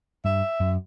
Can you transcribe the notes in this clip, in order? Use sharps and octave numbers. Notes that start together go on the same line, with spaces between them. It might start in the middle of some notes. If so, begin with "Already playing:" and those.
G2 E5
F#2